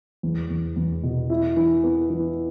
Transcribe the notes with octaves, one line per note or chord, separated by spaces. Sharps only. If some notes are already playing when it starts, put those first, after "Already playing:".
E2
E2
E2
B2
E4
E3
B3
E3